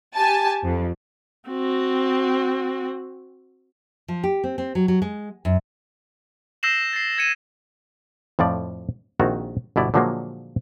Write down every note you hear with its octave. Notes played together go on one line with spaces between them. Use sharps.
G4 G#5 A5
F2
C4 F#4
F3
G4
C4
C4
F#3
F#3
G#3
F#2
E6 G6 A#6 C7 E7 F#7
A6 C7
G#6 C#7 D#7
F2 A2 F3 D5
A#1 D#3 C4 F#4 A#5
G1 B2 E4 D5
A#2 D3 F3 F#3 G#3 A#3